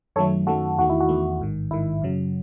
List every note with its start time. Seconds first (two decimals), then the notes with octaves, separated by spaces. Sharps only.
0.16 F#2 D#3 F#3 A3 A4 C#5
0.47 F#2 D#3 F#3 A3 F#4 A4
0.78 E2 D#3 A3 F#4
0.90 E4
1.01 F#4
1.09 E2 D#3 A3
1.40 A1 G#2 D#3
1.71 A1 G#2 D#3 E4
2.02 F#2 C#3 F#3